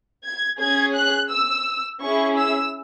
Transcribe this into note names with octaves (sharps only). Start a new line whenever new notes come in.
G#6
C#4 G#4 G#6
F#6
E6
C#4 E4 G#4 C#6
E6